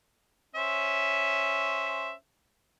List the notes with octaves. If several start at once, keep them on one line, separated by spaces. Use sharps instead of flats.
C#4 C5 E5